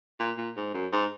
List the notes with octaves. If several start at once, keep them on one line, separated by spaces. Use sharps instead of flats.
A#2
A#2
G#2
F#2
G#2